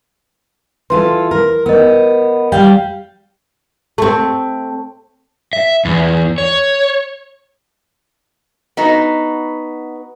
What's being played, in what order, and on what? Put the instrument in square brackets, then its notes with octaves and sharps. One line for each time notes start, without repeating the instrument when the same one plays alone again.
[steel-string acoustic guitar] E3 F4 A4 [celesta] B4 C6
[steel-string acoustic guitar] A#4
[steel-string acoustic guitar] B3 [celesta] A#4 D#5
[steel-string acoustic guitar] G3 F5 G5
[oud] A3 C4
[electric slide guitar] E5
E2
C#5
[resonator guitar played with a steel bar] B3 D#4 F#4